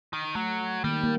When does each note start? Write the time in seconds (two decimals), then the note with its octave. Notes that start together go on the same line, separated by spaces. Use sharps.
0.13 D#3
0.35 F#3 A3
0.84 D#3 G3 A#3
1.03 A#3